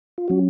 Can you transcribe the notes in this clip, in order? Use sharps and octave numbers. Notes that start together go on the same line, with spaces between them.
F4
F#3 C#4 F#4